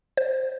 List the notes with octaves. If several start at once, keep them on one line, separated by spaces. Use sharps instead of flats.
C5